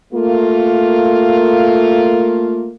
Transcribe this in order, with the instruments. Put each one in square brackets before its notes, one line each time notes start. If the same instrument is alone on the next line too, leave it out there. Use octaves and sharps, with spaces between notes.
[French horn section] A3 A#3 F4